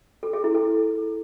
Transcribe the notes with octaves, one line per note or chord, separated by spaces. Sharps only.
A4
G#4
E4
A4